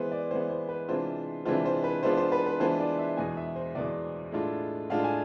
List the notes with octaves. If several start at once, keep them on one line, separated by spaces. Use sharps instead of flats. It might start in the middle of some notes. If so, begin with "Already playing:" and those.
Already playing: E3 G#3 B3 B4 C5
D5
E3 G#3 B3 C5
C5
B4
C3 E3 G#3 D4 F4 C5
C3 E3 G#3 D4 F4 C5
C5
B4
E3 G#3 B3 D4 F4 C5
C5
B4
B4
E3 G#3 B3 D4 F4 C5
D5
E5
E2 B2 G#3 G#5
E5
C5
E2 B2 G#3 D5
A2 G#3 D4 F4
A2 G#3 D4 F4 F5
G#5